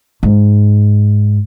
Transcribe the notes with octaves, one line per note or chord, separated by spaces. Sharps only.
G#2